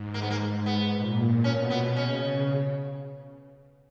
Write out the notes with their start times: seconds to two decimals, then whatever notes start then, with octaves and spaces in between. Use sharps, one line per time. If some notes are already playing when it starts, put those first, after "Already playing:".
Already playing: G#2
0.14 A#3
0.22 B3
0.30 A#3
0.40 G#2
0.66 B3
0.92 A#2
1.44 B2 C#4
1.70 B3
1.96 C#3 C#4